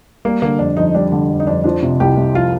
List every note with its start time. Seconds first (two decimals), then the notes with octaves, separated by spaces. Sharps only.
0.25 G3 A#3
0.42 D3 A#3
0.59 F2 D4
0.77 F2 D#4
0.95 G3 D4
1.12 D3
1.30 F2
1.40 D#4
1.47 F2 D4
1.64 F3 D4
1.82 C3
2.00 C2 G4
2.17 C2
2.35 F3 F4